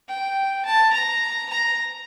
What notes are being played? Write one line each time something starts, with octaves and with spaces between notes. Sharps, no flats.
G5
A5
A#5
A#5